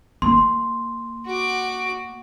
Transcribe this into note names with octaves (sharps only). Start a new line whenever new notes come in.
A#3 C6
F#4 D6